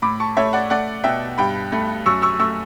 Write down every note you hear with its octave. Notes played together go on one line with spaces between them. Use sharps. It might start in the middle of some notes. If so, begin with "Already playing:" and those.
A2 B5 D6
A5 C#6
A3 C#5 E5
D5 F#5
A3 D5 F#5
B2 E5 G5
G2 G5 B5
A3
F#2 C#6 E6
C#6 E6
A3 C#6 E6